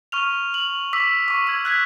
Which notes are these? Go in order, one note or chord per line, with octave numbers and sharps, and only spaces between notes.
C#6 F6 F7
F#7
D6 E6 B6
C#6 D6
E6 G#6
F#6 G#6 B6